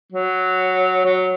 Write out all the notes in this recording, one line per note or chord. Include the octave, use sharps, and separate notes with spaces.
F#3
F#3